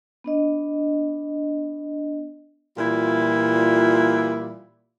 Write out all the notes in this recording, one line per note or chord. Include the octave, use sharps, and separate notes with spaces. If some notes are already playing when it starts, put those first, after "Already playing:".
B3 D4 D#5
A#2 E3 G3 E4 F4